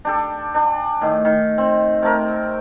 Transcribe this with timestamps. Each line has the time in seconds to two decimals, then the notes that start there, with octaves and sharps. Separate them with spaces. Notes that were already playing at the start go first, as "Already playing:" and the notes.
0.05 D4 G4 A4
0.54 D4 G#5
1.01 A2 D#3
1.25 D#3
1.58 C4
2.02 C3 A3 A#4